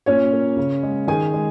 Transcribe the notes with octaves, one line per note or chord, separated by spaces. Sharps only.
A#2 C#4 C#5
A#3
C#3
G#3
D#3 G#4 G#5
G#3